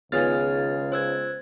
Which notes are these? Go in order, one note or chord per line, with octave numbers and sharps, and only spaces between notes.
C#2 D#3 B3 F4 G#4 C#5 F6 A6
C5 E6 G#6